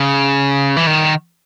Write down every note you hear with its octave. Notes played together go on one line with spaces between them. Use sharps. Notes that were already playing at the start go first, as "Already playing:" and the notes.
Already playing: C#3
E3
D#3